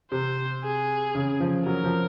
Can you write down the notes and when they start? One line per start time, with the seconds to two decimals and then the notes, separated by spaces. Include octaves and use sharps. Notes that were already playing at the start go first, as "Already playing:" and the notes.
0.12 C3 C5
0.64 G#4
1.15 C#3
1.40 F3
1.66 F#3 A#4
1.84 F3